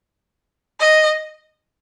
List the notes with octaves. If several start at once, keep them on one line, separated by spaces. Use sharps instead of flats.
D#5